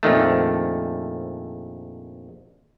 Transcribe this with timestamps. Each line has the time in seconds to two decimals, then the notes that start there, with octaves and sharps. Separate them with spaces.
0.03 A#1 F2 D#3 A3